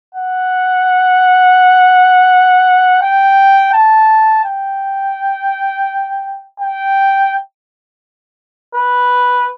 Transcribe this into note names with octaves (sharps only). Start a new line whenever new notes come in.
F#5
G5
A5
G5
G5
B4